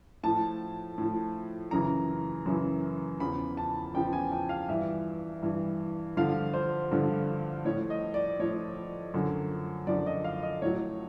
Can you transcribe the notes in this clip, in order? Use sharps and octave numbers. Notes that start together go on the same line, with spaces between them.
A2 F3 A5
A2 F3
F#2 C#3 E3 A#5
F#2 C#3 E3
E2 C#3 F3 B5
A5
E2 C#3 F3 G5
G#5
G5
F5
G2 E3 E5
G2 E3
G2 D3 F3 F5
C5
G2 D3 F3
A2 F3 C#5
D#5
D5
A2 F3 C#5
F#2 D3 F3
F#2 D3 F3 D5
D#5
F5
D#5
A2 F#3 C#5